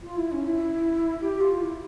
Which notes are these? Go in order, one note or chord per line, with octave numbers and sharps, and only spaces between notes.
F4
E4
C#4
E4
G4
F4
E4